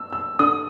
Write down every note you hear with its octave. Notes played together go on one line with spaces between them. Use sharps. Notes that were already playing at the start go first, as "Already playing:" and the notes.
Already playing: E6
E6
D3 D#6